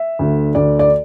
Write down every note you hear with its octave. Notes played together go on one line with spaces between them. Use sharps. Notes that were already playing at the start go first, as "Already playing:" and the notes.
Already playing: E5
D2 D3
D2 D3 D5
D5